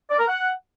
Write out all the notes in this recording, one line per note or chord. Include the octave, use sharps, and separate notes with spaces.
D5
A#4
F#5